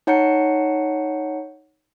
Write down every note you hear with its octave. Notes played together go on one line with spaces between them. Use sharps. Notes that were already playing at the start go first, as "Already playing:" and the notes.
D#4 C#5 F#5 A#5 C#7